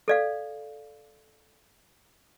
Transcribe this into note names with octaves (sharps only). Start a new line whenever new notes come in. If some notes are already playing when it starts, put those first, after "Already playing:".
A4 D5 F5